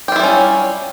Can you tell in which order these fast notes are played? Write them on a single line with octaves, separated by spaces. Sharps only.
G4 F4 E4 G3 C#4